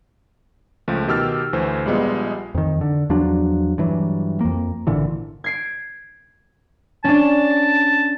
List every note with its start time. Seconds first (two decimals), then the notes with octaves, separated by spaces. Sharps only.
0.88 C#2 F3 A3
1.08 B2 D#3 G4 E6 F6 A6
1.53 D2 E3 A3 C5
1.86 A#1 G3 G#3 B3 F4
2.55 F2 D#3
2.81 D3
3.10 E2 F3 F#3 D4
3.78 G2 E3 F#3
4.41 F2 A#3
4.87 G#1 A#2 D3 E3
5.44 G#6 C7 D7
7.04 C#4 D4 A5